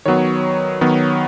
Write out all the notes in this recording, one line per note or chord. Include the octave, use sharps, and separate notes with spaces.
D#3 F#3 B3 C#5
D#3 F#3 B3